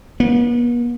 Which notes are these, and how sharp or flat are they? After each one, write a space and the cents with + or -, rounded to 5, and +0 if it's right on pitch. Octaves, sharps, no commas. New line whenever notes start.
B3 -45